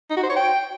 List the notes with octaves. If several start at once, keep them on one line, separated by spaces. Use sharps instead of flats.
D#4
F#4
C5
C#5
G5